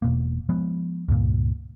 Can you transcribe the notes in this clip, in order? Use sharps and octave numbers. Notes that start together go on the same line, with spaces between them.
E1 B2 A#3
F3 G#3 B3
C#2 G2 A#2